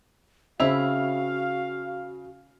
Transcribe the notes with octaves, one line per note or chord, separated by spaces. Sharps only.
C#3 C4 E4 F#4 E5 F5 F7